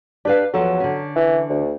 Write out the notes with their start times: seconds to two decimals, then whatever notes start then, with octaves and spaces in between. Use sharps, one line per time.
0.25 D4 G4 B4 F5
0.54 E2 F3 F#3 A4
0.80 D3 C#4
1.16 E3
1.50 D2